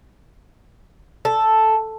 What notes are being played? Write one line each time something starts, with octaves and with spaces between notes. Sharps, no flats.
A4